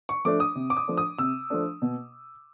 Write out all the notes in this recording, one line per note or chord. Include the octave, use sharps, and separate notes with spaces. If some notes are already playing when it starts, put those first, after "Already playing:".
C#6
F3 A3 D4 D6
D#6
C3
D6
D#6
F3 A3 D4
D#6
C3 E6
F3 A3 D4
B2